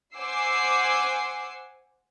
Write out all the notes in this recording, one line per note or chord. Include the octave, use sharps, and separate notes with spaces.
C5 F#5 G#5 D6 E6 C7